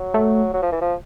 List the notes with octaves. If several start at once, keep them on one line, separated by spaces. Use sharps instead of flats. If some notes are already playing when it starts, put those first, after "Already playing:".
Already playing: F#3
A3
F#3
F3
E3
F3